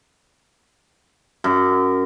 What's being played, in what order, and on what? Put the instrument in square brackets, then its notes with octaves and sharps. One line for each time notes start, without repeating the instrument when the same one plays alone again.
[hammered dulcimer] F#2